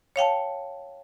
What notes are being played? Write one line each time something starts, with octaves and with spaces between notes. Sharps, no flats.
C#5 F5 G5 A5